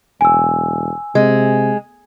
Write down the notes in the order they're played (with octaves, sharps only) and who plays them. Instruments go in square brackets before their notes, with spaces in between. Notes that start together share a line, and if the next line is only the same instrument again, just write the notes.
[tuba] E1 [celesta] G#5 E6
[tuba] C3 [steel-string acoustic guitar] G#3